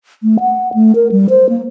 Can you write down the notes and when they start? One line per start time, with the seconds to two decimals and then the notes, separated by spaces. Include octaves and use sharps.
0.23 A3
0.40 F#5
0.74 A3
0.95 A#4
1.12 G3
1.29 C5
1.49 A#3